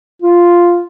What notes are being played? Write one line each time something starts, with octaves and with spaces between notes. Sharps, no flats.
F4